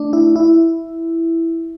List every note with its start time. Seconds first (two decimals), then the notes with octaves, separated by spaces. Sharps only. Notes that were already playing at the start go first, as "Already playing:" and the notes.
Already playing: A3 D4
0.13 E4
0.36 E4